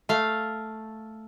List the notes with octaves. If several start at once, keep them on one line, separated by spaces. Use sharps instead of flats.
A3 F5